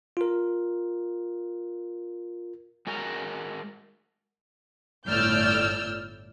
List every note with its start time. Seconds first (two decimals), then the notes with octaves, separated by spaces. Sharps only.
0.17 F4 A#4
2.87 G#3 F#4 A#4
5.07 G1 A2 D5 E6 F6 G6